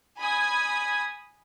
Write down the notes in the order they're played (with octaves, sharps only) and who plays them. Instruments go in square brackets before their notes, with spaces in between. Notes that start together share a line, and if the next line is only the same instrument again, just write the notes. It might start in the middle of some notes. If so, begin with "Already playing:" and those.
[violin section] G#5 B5 D#6 G#6